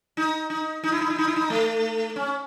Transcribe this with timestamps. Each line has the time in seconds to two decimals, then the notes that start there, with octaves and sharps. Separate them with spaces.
0.17 D#4
0.50 D#4
0.84 D#4
0.92 E4
1.01 D#4
1.10 E4
1.19 D#4
1.27 E4
1.36 D#4
1.50 A3
2.16 C#4